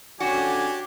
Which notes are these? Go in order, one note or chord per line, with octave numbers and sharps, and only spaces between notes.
D3 C#4 D4 F#4 G4 G#5